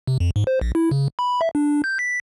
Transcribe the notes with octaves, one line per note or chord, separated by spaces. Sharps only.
C3
F2
G#2
C5
A#1
E4
C#3
B5
E5
D4
G6
B6